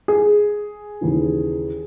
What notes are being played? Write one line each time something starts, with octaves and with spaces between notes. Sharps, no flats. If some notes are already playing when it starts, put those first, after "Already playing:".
G#4
D#2 C#3 E3